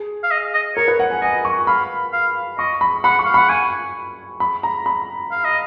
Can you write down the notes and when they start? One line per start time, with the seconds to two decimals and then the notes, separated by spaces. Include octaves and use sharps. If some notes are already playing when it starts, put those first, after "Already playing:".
Already playing: G#4
0.23 F5
0.31 D#5
0.54 D#5
0.76 A#4 C#5
0.88 B4
1.00 F#5
1.10 G#5
1.22 D#5 G#5
1.45 C#6
1.67 F5 B5
2.13 F5
2.58 D#5 C#6
2.81 B5
3.04 F#5 B5
3.19 C#6
3.25 F5
3.34 F#5 B5
3.49 G#5 C#6
4.40 B5
4.63 A#5
4.86 B5
5.31 F5
5.45 D#5